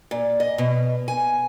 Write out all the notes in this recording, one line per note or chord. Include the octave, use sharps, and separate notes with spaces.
A#2
D#5
B2
G#5